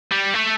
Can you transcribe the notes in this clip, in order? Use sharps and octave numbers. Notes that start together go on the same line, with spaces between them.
G3
A3